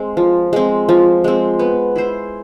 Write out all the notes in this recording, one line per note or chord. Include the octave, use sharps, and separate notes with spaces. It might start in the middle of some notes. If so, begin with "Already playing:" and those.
Already playing: G#3 C4
F3
G#3 C4
F3
G#3 C4
B3
E4 G#4 C5